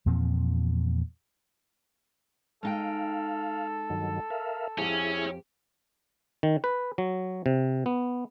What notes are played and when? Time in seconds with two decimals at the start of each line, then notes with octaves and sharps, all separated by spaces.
0.06 E2 A#2 F3 C4
2.63 G#3 D#4 A4 F5 G5
3.90 G2 D#3 F#3
4.30 A#4 E5 F5
4.78 F2 C#4 E4 G4 G#4
6.43 D#3
6.64 B4
6.98 F#3
7.46 C3
7.86 B3